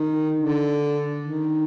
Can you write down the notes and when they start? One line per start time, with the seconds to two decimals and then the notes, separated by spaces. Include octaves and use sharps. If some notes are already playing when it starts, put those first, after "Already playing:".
Already playing: D#3
0.36 D3
1.22 D#3